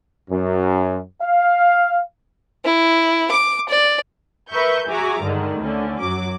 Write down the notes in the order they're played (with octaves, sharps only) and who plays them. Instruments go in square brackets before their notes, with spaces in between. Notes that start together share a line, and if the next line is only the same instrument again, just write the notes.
[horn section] F#2
F5
[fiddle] E4
D6
D5
[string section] A#4 B4 E5 C#6 G6
F#4 G#4 E5 G#5 A#5 D6
G2 D3 D#3 G#3
D2 D3 C#4
F#2 F#3 D6